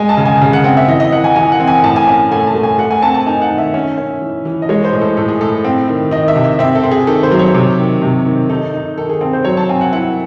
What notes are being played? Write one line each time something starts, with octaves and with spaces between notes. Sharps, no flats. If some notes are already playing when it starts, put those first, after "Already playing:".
Already playing: G#3 G#5
A5
C#3
G#5
C#3
F#5
C4 F#5
E5
E3 D#5
D#5
E3 F#5
G#5
E3 G#5
F#5
C4
G#5
A2 A5
G#5
C#4 G#5
A3 G#5
A5
A3
G#5
A3 F#5
G#5
C4 A5
A5
D#4 G#5
F#5
D#3
E5
C#4
C#4
E3
E3
D#5
G#3 C#5
C5
A2
A4
A2 A4
G#4
A2 A4
C4
D#3
D#3 D#5
E5
C3
E5
C4 E5
A4
C4
G#4
D#3 A4
C5
F#3
C#5
C3
D#3
C3
D#3
D#4 A4
D#4
D#3 A4
G#4
C4 A4
C5
F#3 C#5
A5
C4 G#5
F#5
E4 F#5